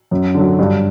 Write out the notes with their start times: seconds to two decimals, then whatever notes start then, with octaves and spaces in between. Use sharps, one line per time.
0.11 F#2
0.34 D3 F#3
0.59 G2